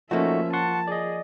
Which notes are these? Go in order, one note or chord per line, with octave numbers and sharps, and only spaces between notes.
F3 A3 A#3 C#4 D#4 F#4 E5
F#5 A5 C6 C#6
G#4 D5 D#5